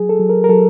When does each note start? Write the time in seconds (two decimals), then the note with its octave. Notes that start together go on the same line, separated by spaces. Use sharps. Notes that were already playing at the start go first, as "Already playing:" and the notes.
Already playing: F#3 G#4
0.09 A4
0.19 F#3
0.29 A#4
0.44 A#4
0.49 F#3 A4